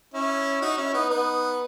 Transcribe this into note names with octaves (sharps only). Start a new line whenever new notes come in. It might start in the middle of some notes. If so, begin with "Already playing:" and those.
C#4 E4
D#4 F#4
C#4 E4
B3 D#4
B3 D#4